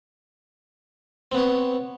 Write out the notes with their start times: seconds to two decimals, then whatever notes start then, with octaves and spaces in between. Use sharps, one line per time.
1.32 C4
1.35 B3
1.37 C#5